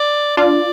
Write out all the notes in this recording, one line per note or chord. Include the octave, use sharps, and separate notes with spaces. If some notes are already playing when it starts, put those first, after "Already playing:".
Already playing: D5
D4 F4 D5